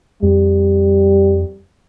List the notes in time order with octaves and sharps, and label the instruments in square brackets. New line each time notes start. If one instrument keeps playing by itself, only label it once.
[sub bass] F2 [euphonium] G3